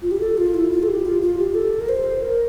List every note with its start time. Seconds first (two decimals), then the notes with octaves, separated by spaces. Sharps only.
0.02 F4
0.11 G4
0.21 A4
0.37 F4
0.54 E4
0.71 F4
0.83 A4
0.88 G4
1.05 F4
1.22 F4
1.38 G4
1.55 A4
1.80 A#4
1.89 C5
2.23 A#4